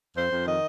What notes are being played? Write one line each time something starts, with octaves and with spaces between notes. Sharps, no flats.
F2 C5
F2
D#3 D#5